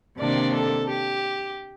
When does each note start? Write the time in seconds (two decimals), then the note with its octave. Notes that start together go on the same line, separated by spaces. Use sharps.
0.19 C3 D#3 A#3 D4 D5
0.54 A4
0.89 G4